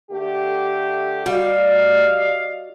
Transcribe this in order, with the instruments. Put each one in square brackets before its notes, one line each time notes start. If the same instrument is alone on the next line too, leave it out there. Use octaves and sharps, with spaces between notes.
[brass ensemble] D3 A3 G4
[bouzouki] G3 [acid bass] F#4 [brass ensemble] D5 D#5 F5